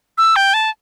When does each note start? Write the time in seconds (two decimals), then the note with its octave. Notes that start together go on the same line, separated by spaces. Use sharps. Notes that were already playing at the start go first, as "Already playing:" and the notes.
0.18 E6
0.36 G5
0.54 A5